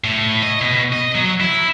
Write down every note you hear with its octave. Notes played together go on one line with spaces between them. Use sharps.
A2
D#5
B2
D#5
F#3
E4